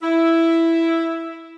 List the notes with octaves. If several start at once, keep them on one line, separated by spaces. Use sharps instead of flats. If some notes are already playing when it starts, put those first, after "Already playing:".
E4